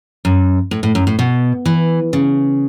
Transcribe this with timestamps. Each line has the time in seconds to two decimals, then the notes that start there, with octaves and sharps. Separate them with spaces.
0.25 F#2
0.71 A2
0.83 A2
0.95 F#2
1.07 A2
1.19 B2
1.66 E3
2.13 C#3